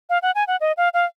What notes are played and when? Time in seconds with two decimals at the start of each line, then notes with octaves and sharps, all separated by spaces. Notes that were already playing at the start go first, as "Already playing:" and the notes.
0.10 F5
0.22 F#5
0.35 G#5
0.48 F#5
0.61 D#5
0.77 F5
0.94 F5